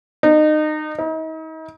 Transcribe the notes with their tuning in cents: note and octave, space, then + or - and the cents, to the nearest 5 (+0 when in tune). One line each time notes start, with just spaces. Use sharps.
D#4 -25
D#4 +40